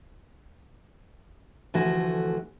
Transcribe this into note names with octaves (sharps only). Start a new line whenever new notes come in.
D2 E3 F3 A3 F#4 G#5